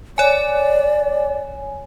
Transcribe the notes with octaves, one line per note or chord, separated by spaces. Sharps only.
C#5 D5 G#5